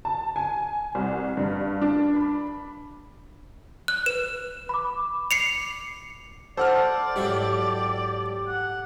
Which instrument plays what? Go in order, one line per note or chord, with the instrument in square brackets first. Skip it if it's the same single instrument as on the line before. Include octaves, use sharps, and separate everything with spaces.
[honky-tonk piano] A5
G#5
C2
G2
D4
B5
[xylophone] F#6
[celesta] B4 [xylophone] E7
[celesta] B5 D6
[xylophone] C7 C#7 F7
[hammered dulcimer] A4 [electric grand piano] C5 F#5 F6 [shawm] D5
[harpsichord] G#2 F#3 E4 [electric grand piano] G4
[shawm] F#5